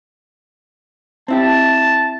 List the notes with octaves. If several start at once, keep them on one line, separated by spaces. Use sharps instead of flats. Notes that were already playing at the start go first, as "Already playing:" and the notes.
C4 E4 G4 A5